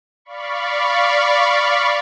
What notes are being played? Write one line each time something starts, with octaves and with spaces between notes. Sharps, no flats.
D5 F5 B5 C#6